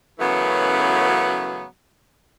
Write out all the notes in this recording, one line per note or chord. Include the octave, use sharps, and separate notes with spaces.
F#2 C#3 E3 F#3 A3 B3